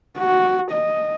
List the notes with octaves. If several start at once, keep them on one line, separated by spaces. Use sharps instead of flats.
F#4
D#5